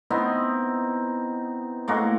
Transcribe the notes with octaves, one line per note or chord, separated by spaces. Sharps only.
B3 C4 D#4 E4
A2 G#3 A#3 F#4